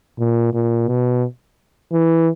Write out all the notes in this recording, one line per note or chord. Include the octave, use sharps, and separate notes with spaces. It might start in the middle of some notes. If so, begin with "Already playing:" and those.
A#2
A#2
B2
E3